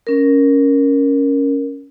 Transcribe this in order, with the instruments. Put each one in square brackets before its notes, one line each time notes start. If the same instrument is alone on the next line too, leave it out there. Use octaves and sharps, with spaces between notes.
[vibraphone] C#4 A#4